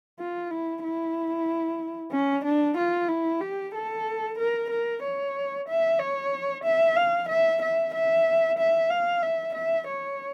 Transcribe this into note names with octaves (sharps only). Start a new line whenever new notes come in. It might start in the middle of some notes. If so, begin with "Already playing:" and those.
F4
E4
E4
C#4
D4
F4
E4
G4
A4
A#4
A#4
C#5
E5
C#5
E5
F5
E5
E5
E5
E5
F5
E5
E5
C#5